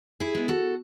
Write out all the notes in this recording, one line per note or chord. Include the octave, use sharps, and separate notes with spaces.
E4 G#4
G#3 B3
F#4 A4